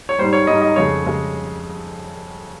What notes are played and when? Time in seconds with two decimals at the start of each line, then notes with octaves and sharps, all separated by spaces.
0.09 C#5
0.18 G#2 G3 C5
0.33 C#5
0.47 G#2 G3 D#5
0.62 D#5
0.76 F2 C#3 G#3 C#5
1.06 C#3 G#3